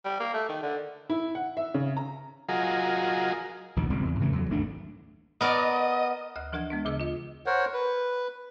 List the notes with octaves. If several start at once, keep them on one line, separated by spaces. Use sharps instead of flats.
G3
A#3
A3
D#3
D3
E4
F#5
E5
C#3
A#5
F#3 F4 G#4 A#4 D#5
A#1 D#2 D#3
G#1 C#2 G3 C4
E2
A2 C#3 E3 A3
E2 F#3
G#1 D#2 A3 D4
B3 A#4 D5 D#5
D2 F#5 F#6
E3 F3 D4 A#4 F#5 G#6
G#3 B3 D4
D2 C#3 G#4 D#5 D6 E6
F4 D#5
A#4 C5 C#5 F#5
B4